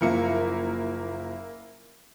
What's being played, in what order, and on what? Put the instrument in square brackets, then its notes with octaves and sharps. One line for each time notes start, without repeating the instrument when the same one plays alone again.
[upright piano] F#1 F3 C#7 [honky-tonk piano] A#3 E4 A#4